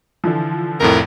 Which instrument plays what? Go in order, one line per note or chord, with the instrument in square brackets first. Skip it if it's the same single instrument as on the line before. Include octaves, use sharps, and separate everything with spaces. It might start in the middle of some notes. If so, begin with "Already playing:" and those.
[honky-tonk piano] D3 E3 F3
[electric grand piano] C2 F2 A2 [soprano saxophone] A#4